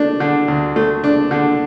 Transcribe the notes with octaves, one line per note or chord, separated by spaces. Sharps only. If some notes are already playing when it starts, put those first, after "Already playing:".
Already playing: A3 D4
D3
D2
A3
D4
D3